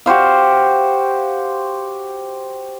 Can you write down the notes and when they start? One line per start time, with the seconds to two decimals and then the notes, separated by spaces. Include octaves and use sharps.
0.06 F#4 G4 C5 F5